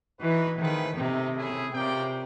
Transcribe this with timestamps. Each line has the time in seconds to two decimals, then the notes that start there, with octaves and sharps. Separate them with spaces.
0.19 E3 D#4 F#4 B4
0.58 D#3 A3 C4 F4 G#4 B4
0.96 C3 A3 C4 D#4
1.34 A3 C#4 E4 G#4
1.73 C3 C#4 F4 A#4 D5 G5